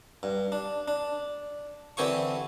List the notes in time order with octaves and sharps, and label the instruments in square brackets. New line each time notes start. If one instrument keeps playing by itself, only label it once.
[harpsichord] G2
D4
D4
D3 E3 C4 G4 G#5 C#6